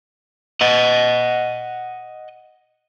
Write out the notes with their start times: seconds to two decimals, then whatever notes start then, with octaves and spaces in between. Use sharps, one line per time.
0.61 D#5 F#5